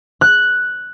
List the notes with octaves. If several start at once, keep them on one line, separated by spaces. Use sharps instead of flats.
F#6